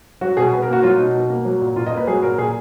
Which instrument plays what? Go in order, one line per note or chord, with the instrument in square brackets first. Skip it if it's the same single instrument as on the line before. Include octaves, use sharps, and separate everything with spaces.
[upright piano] F#3 F#4
B2 G#4
B2 B4
A#4
A#3 F#4
F#3 F4
B2 D#4
B2
A#3
F#3
A#2
A#2 F4
D#5
A#3
B4
F#3 G#4
A#2 A#4
A#2 G#4